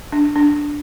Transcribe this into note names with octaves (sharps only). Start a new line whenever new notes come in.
D4
D4